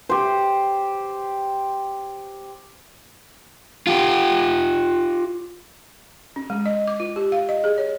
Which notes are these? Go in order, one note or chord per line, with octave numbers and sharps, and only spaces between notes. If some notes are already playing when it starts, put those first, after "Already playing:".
G4 C5
F4 G4
C#4
G#3
D#5
D6
F4
G4
F5
D#5
G#4
C#5